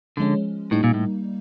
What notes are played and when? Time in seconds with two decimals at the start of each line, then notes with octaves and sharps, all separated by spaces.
0.17 D3 F3 G#3 C#4
0.71 A2 G3 A#3 D#4
0.84 A#2
0.94 A2